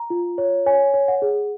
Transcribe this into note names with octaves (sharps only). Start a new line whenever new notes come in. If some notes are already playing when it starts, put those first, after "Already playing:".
Already playing: A#5
F4
C#5
C#5 G#5
C#5
F#5
G#4